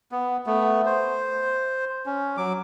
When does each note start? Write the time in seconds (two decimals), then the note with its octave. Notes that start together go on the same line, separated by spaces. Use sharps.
0.12 B3
0.46 A3 B3
0.86 C5
2.06 C#4
2.37 F#3 D6